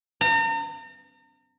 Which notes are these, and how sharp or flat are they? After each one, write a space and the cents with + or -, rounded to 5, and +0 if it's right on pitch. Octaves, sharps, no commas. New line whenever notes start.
A#5 -40